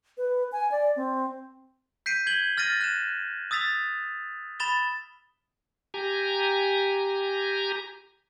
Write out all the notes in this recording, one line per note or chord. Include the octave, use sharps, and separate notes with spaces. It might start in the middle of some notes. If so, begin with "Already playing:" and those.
B4
G#5
D5
C4
G6 B6 C7 D7 D#7
G#6 F#7 G7
F6 A6 A#6 D#7
F#6 E7
D#6 E6 A6 B6 F7
B5 A6 E7 G7
G4 G#5 A#5